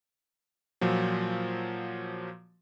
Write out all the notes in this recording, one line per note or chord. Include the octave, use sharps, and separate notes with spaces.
A#2 F3 F#3